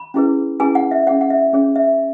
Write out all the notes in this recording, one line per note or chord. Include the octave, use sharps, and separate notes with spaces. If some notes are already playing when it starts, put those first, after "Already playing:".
Already playing: B5
C#4 E4 G#4 B4
C#4 E4 G#4 B4 G#5
F#5
E5
C#4 G#4 C#5 F#5
F#5
E5
C#4 G#4 C#5
E5